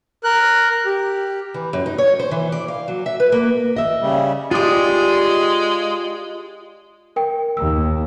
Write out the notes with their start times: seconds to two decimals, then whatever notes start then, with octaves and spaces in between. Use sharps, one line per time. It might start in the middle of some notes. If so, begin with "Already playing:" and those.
0.24 A#4 F#6
0.85 G4
1.54 E3
1.73 F#2
1.86 D#4
1.98 C#5
2.19 C5
2.31 E3
2.52 D5
2.68 F5
2.88 F#3
3.06 E5
3.20 B4
3.32 A#3
3.76 D#5 E5
4.02 C#3 G3
4.51 G#3 D4 F4 G4 D#6
7.16 A#4 G5
7.57 D#2 E6